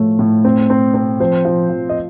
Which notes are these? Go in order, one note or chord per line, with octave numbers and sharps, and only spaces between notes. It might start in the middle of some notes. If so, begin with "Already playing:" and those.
Already playing: A2 F3 A3 C#5
A2
C4
C4
C4
F3 C5
F3
F3
D#5